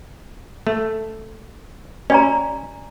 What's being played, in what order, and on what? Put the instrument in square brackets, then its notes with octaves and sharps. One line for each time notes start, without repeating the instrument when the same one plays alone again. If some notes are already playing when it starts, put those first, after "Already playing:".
[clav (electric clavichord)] A3
[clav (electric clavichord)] C#4 [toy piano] D5 G#5 A#5